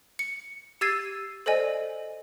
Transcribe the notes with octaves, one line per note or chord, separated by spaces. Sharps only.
C#7
G4 E6 G#6 A6 C7 D#7
A4 C5 D5 D#5 G#5